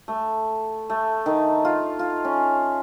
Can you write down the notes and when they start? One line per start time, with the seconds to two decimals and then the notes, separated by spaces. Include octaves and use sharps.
0.08 A3
0.90 A3
1.26 D#3
1.65 F4
1.99 F4
2.25 C#4